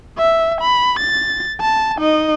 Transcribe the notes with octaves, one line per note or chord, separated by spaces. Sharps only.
E5
B5
A6
A5
D#4 D#5